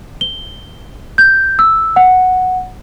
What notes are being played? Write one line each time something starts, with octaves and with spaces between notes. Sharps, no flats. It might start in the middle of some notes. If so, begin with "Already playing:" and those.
G7
G6
E6
F#5